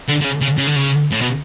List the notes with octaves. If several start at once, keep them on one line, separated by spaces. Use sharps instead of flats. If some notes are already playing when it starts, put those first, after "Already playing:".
D3
D3
C#3
C#3
C#3
D3
C#3
A2
B2